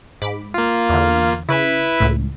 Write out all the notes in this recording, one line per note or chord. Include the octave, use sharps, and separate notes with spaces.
G#2 B5 D6
A#3 F4
E2 D3
C#3 E4 B4 E5
C#2 A2